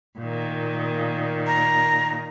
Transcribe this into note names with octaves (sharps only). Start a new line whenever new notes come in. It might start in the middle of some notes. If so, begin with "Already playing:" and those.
A#2 D#3
A#5